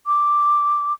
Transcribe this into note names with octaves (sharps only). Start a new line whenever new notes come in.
D6